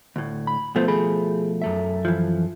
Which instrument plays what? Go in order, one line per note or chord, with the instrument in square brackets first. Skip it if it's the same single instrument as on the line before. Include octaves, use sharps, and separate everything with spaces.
[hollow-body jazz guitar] D2 A2
[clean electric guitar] B5
[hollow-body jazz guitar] B2 F3 A3 [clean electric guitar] B3 C5
[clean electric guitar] G#4 B5
F#2 A4 E5
[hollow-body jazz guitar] E3 F3